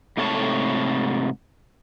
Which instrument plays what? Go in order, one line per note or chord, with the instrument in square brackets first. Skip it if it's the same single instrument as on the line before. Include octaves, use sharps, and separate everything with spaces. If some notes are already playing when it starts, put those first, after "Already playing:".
[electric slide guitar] G#2 C3 A3 A4 C#5 A5